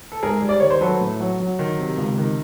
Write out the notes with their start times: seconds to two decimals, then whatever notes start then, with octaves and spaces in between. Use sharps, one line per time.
0.12 A4
0.23 G#2 G#4 A#4
0.42 G3
0.49 D5
0.60 D#3 C#5
0.70 C5
0.81 F#3 A4 B4
1.01 A2
1.20 F#3
1.40 F#3
1.59 D#3
1.79 C3
1.98 C#2
2.18 D#3